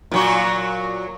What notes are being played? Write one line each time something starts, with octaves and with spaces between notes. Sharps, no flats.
A#2 F#3 F#4